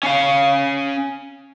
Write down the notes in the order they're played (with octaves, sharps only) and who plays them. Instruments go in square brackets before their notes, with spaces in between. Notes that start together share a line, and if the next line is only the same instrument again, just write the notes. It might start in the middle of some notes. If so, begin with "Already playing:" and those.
[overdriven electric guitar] C#4 F5